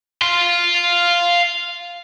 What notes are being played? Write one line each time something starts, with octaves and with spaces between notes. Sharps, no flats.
F5 C6